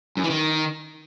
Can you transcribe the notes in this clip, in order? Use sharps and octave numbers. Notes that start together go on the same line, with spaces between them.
F#2
E3
D#3